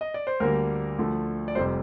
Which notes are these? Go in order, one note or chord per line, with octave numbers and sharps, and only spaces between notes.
D#5
D5
C5
D2 D3 G3 A#3 A#4
D2 D3 F3 A3
D5
F1 F2 C3 G3 C5